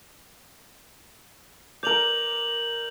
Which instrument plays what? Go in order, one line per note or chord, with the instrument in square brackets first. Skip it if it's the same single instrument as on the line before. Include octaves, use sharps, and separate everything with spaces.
[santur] A#4 D5 [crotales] G6 F7 F#7